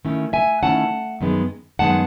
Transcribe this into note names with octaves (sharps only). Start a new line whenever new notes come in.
D#3 A3 C#4 E4
E5 G#5
D#3 A3 C#4 E4 F#5 A5
F#2 D#3 G#3 B3
F#2 D#3 G#3 B3 F#5 A5